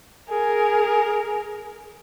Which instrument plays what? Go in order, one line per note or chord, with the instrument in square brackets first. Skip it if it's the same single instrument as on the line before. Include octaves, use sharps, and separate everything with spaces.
[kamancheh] G#4 A#4